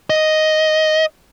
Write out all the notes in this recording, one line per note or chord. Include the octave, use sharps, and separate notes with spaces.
D#5